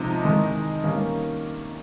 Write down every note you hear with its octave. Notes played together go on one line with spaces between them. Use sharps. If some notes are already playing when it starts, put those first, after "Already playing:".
Already playing: C3 F3 G#3 D#4
D#3 G#3 D#4
D#3 G3 A#3 C#4